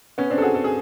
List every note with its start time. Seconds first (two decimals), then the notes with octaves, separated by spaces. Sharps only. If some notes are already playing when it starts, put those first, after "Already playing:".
0.18 B3 C#4
0.30 C4 D4
0.38 A4
0.42 F#4 G#4
0.54 A4
0.64 G#4